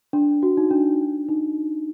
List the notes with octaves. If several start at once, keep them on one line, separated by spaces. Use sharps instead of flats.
D4
F#4
D#4
D4
D#4